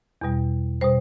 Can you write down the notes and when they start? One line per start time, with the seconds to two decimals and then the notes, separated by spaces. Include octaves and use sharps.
0.21 E2 B2 G3
0.81 B2 G3 C5